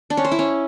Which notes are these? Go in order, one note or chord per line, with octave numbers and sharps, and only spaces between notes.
D4
C#4
C5
E4
C#4